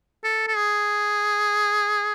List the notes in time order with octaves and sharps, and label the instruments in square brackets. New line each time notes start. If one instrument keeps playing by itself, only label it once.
[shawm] A4
A4
G#4